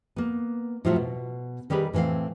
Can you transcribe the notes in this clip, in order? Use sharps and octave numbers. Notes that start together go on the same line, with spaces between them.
A#3 B3
A2 F3 F#3 F4 E5 F#5
B2
D#3 G3 G4 G#4 B4
A2 E3 A3 C4 F5